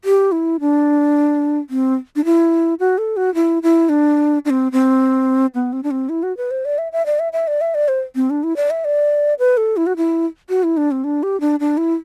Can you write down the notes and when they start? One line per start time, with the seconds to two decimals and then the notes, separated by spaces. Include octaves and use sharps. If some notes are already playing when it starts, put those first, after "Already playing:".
0.05 G4
0.32 E4
0.60 D4
1.70 C4
2.16 D4
2.25 E4
2.80 F#4
2.98 A4
3.17 F#4
3.35 E4
3.63 E4
3.89 D4
4.45 D4
4.50 C4
4.72 C4
5.55 B3
5.73 C4
5.83 D4
5.91 C4
6.09 E4
6.23 F#4
6.37 B4
6.51 C5
6.65 D5
6.78 E5
6.92 E5
7.06 D5
7.19 E5
7.33 E5
7.48 D5
7.61 E5
7.75 D5
7.88 C5
8.15 C4
8.30 D4
8.43 E4
8.56 D5
8.70 E5
8.85 D5
9.39 B4
9.57 A4
9.77 E4
9.86 F#4
9.97 E4
10.49 F#4
10.63 E4
10.77 D4
10.91 C4
11.04 D4
11.23 G4
11.41 D4
11.60 D4
11.77 E4